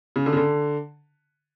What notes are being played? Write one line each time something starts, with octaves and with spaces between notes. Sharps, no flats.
C#3
D3
C#3
D3